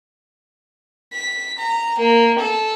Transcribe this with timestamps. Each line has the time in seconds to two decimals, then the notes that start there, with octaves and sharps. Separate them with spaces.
1.13 B6
1.58 A#5
1.98 A#3
2.38 A4